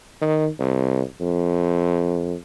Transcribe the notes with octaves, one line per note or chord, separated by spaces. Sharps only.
D#3
C2
F2